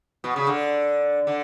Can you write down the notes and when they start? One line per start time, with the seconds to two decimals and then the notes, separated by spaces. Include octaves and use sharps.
0.24 B2
0.36 C#3
0.47 D3
1.27 D3